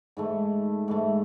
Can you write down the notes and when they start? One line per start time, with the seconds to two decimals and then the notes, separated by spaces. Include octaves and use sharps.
0.17 G#2 E3 A3
0.88 G#2 E3 A3